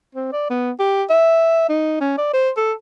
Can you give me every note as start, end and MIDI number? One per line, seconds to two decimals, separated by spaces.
0.15 0.28 60
0.33 0.49 74
0.50 0.71 59
0.79 1.04 67
1.10 1.65 76
1.69 1.96 63
2.01 2.15 61
2.18 2.30 74
2.33 2.50 72
2.57 2.73 69